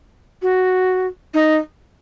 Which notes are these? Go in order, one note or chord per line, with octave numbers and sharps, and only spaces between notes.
F#4
D#4